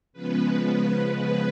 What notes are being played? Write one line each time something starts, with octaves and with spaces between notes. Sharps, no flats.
C#3 F3 G#3 B3 B4